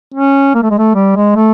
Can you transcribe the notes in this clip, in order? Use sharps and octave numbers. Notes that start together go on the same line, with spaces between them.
C#4
A#3
A3
G#3
A3
G3
G#3
A3